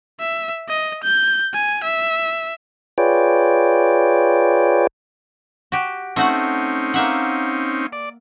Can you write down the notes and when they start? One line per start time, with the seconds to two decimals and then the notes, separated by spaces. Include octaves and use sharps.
0.20 E5
0.69 D#5
1.04 G6
1.53 G#5
1.84 E5
2.98 F4 G#4 B4 C#5 D5 G5
5.72 F#4 G4
6.16 A3 C4 C#4 D#4 F#4 F#5
6.94 A#3 E5 F#5
7.92 D5